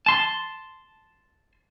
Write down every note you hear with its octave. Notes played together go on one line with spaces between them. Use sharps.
A5 C6